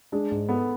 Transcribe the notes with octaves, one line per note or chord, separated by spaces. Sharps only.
G#3 D4
G#2
B3 A4